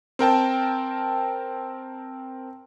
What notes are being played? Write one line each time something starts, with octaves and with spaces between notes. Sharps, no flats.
C4 A#4 G5 A5